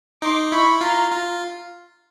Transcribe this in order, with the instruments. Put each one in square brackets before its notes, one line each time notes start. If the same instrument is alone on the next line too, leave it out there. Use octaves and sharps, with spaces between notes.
[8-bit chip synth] D#4 [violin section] C6 D6
[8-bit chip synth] E4 [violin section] B5 C#6
[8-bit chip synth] F4 [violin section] A#5 C6
[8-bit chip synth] F4